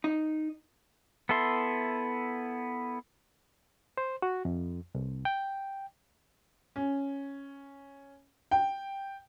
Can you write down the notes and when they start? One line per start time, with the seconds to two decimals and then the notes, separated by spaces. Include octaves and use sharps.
0.04 D#4
1.29 B3 E4 A4 E5 C6
3.97 C5
4.22 F#4
4.45 F2
4.95 C2
5.25 G5
6.76 C#4
8.51 G5